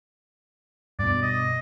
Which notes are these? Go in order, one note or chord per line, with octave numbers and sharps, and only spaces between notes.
G2 B2 D5
D#5